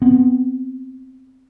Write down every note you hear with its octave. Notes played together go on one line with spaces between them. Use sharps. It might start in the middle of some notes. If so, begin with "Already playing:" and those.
B3 C4